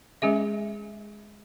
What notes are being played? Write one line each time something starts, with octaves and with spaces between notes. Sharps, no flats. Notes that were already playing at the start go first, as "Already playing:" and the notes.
G#3 C#4 G#4 E5